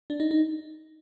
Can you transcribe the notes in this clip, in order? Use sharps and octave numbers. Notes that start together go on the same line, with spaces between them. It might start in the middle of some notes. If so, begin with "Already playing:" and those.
D4
D#4
D#4